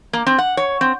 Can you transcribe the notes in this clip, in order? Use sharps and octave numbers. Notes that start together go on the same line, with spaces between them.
A#3
C4
F#5
C#5
C4